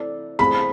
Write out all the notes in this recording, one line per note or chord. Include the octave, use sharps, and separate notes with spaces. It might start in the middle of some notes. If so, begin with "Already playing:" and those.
Already playing: C4 E4 A4 D5
A3 C4 E4 G#4 B5